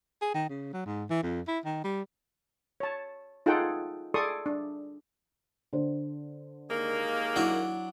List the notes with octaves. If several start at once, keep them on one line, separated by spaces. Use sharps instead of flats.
G#4
D#3
C#3
F#3
G#2
E3
F2
E4
D#3
G3
C#5 A5
D#4 F4 G#4 A4 F#5 G5
G#4 A4 D5 C6 C#6 D#6
D4
D3 C5
D#2 G#3 A#3
F#3 D4 E4